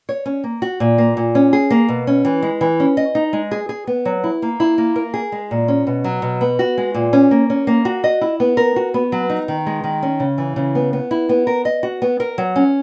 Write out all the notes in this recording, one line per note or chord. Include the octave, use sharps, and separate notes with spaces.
C#5
C#4
A#3
F#4
A#2
A#3
A#2
C#4
G#4
A#3
B2
C#4
E3
G#3
E3
C#4
D#5
D#4
G#3
G#4
G#4
B3
F#3
E4
A#3
E4
A#3
A#4
G#4
G#3
A#2
C#4
B2
F#3
B2
B3
F#4
G#3
A#2
C#4
A#3
C#4
A#3
F#4
D#5
E4
B3
A#4
F#4
B3
F#3
D#4
D#3
G#3
D#3
C#4
C#3
E3
C#3
B3
B3
E4
B3
A#4
D#5
F#4
B3
A#4
F#3
C#4